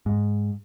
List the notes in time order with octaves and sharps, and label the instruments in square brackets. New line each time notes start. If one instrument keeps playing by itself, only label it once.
[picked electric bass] G#2